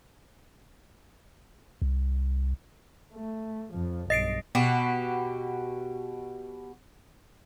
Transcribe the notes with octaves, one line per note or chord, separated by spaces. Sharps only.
C2
A3
F2 F3
B1 G2 D#5 A6 C7 D7
B2 F#4 G4